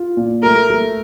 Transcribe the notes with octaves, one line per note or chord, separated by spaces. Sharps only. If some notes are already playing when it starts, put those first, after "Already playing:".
Already playing: F4
A#2
A3 A#4
A3